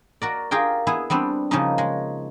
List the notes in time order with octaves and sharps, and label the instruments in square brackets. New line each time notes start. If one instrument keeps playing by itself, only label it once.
[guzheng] F#4 A#4 D5
F4 G4 G#4 A#4 G5
B3 E4 G#4
G3 B3 C4 D4
C#3 F3 G3 A#3 C#4 D#4
G#3